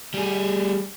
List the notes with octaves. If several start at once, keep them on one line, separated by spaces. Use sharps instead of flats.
G3 G#4